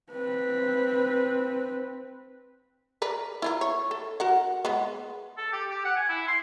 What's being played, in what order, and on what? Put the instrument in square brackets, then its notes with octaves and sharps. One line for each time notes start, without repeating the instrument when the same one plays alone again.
[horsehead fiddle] C4 B4
[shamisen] A#4 B4 D5
E4 F4 A#4
C#5
A4
F#4 A#4 F#5
G#3 B3
[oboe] A4
G4
G4
F#5
G#5
E4
C6